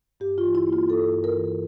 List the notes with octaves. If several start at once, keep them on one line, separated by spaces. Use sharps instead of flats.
G2 G4
F4
E3
E4
A#3
F4
G2 A4
G2
A#4
E3